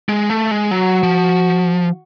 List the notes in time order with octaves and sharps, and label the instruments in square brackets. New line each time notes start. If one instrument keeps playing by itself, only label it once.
[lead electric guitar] G#3
A3
G#3
[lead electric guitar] F#3 [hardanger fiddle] F#4
[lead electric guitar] F3